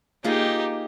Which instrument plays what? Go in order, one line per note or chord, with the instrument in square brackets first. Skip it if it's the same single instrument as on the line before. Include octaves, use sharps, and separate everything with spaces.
[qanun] A#3 F4 G#4 [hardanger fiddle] D#4 G4